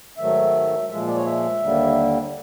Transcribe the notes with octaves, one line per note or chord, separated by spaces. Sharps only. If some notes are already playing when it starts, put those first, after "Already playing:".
G#2 D#3 F#3 A3 E5
A#2 F3 G#3 E5
D5
C#5
E5
D#2 D3 G3 A#3